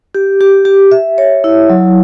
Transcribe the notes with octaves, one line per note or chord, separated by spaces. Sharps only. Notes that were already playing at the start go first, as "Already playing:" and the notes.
G4
G4
G4
E5
C#5
E4
F#3